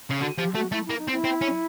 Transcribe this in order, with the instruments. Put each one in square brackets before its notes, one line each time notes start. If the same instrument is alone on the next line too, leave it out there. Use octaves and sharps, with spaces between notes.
[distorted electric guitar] C#3
[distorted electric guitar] D3 [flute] F#4
[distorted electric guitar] F3 [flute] G4
[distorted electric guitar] A3 [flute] F#4
[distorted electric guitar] A3 [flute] E4
[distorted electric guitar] A#3 [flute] E4
[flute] D#4
[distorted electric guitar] C4
[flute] E4
[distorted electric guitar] C4
C#4